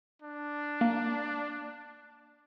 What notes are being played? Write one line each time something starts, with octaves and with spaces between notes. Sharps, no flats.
D4
A#3